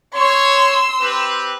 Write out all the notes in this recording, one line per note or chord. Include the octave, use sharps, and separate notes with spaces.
C#5 C6 E6
C4 G4 B4